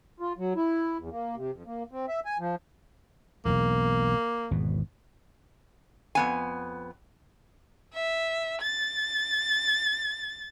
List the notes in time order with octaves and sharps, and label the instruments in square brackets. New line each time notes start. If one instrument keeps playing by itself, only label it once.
[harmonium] F4
F#3
E4
E2
A#3
C3
F2
A#3
C4
E5
G#5
F3
[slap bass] E1 B1 E2 [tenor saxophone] A#3
[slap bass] G#1 E2 B2
[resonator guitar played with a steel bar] F2 B3 G#5
[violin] E5
A6